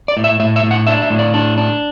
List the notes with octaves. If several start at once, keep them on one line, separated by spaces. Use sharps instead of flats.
D5
A2
E5
A2 E5
E5
A2
F#5
D4 E5
E5
A2
D5
D4
D4